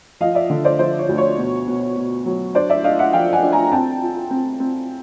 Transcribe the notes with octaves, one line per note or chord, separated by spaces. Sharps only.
F3 D#5 F5
D5 E5
D3
C5 D5
F3 C5
C#5
D2
C#5
B2
B2
B2
F#3
D4 C5 D5
D5 E5
D4 D#5 F5
E5 F#5
F3 F5 G5
F#5 G#5
D4
G#5 A#5
C4 G5 A5
F4
C4
C4